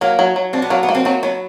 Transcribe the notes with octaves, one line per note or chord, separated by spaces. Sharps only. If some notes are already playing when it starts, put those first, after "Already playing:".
F#3 A#3
F#3
F#3
C4 D4
B3
F#3 A#3
B3
A#3
C4
F#3 C4
F#3 B3